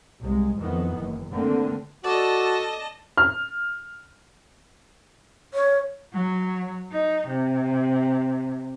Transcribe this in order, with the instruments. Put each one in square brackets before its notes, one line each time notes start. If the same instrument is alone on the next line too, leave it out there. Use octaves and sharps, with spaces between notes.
[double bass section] C2 G#3
F2 D#3 E3 B3
F#1
D3 A3 A#3 C4
[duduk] F#4 [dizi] A4 [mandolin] D5 [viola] D#5 A5
[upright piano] F6
[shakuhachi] C#5
[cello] F#3
D#4
C3